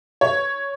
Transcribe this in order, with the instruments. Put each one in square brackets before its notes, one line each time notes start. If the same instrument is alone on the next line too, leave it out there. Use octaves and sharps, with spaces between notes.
[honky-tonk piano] C#5